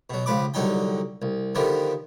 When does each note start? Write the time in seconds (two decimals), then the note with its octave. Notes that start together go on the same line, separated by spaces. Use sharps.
0.10 B2 F#3
0.26 C#2 F3 B4 D6
0.54 C2 D3 F#3 D#4 G5
1.22 C2
1.55 D3 D#3 F3 B3 G4